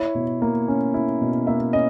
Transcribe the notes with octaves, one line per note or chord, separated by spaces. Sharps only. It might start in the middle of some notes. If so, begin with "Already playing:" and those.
Already playing: E4 C#5
B2
A#3
C#4
E4
B2
A#3 E5
C#4 D#5